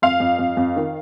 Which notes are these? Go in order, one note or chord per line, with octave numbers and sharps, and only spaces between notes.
F2 F5
F2
F2
F2
D#3